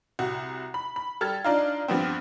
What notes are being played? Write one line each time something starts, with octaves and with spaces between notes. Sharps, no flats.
C2 F#4
B5
B5
G3 A4 F6 G#6 A6
D4 D#4 F4
G2 F3 B3 C4